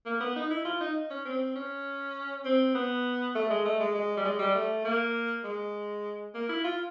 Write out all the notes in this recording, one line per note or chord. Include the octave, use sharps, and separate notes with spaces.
A#3
B3
D#4
E4
F4
D#4
C#4
C4
C#4
C4
B3
A3
G#3
A3
G#3
G#3
G3
G#3
G3
A3
A#3
G#3
A#3
E4
F4